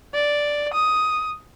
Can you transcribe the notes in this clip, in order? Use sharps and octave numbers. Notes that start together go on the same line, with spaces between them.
D5
D#6